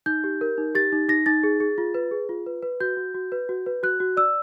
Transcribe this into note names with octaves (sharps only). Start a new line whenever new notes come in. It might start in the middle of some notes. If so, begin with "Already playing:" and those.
D#4 G6
G4
A#4
D#4
G4 A6
D#4
D#4 A#6
D#4 A6
G#4
G#4
F4
B4
G#4
F4
B4
B4
F#4 G6
F#4
F#4
B4
F#4
B4
F#4 F#6
F#4
D5 E6